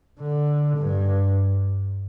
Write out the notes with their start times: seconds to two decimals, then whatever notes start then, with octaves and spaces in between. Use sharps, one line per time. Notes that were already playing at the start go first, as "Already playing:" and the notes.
0.20 D3
0.77 G2